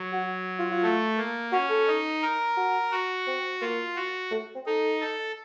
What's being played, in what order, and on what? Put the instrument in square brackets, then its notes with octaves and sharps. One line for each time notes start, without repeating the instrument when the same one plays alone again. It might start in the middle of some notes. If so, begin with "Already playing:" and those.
Already playing: [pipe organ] F#3
[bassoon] F#4
F4
F4
[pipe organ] A3
A#3
[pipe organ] C#4 [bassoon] F#4
[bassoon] A4
[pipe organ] D#4
A#4
[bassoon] F#4
[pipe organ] F#4
[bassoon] C4
[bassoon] A#3 [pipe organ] F4
[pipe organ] F#4
[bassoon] A3
C4
[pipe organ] D#4 [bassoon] A4
[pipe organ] A4